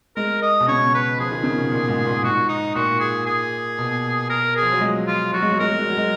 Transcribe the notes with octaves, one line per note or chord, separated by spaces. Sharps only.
G#3 A#4
D#5
B2
C#3 C#5
B4
F3 G#4
D#3
C#3
B2
A#2
G#2
A#2
G#2 F#4
D#4
A#2 F#4
G#4
G#4
B2
A#4
G#4
F3
F#3
G#3
F4
F#3 F#4
G#3
F#3
G#3 A#4
F#3
G#3
F#3
G#3